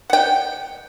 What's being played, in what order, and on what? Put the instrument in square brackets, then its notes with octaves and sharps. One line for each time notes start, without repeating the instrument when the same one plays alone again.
[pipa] F#5 G5